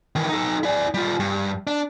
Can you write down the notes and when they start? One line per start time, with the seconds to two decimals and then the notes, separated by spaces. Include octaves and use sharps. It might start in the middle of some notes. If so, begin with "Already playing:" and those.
0.15 D#3 E3
0.29 D#4 A4
0.63 E4 D5
0.94 G3 F4
1.20 G2
1.67 D4